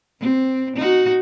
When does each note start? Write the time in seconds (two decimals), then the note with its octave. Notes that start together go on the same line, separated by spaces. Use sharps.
0.20 C4
0.77 D#4 F#4